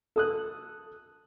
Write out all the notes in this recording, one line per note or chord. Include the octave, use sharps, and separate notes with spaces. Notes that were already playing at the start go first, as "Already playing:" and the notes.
A4 D#6 F#6